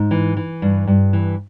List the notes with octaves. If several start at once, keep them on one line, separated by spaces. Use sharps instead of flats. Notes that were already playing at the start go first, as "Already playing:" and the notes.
Already playing: G#2
E3
E3
G2
G2
E3